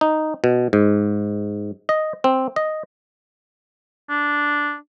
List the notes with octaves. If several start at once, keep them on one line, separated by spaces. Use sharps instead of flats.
D#4
B2
G#2
D#5
C4
D#5
D4